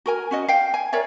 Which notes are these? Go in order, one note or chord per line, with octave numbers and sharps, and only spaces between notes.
F#4 A#4 G#5
C#4 F#4 D#5
F5 G5
G#5
A#4 C#5 D5 E5